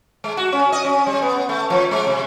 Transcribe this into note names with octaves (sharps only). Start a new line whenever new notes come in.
G#3
F#4
C#4
D#5
C#4
G3
B3
A3
F3
G#3
C3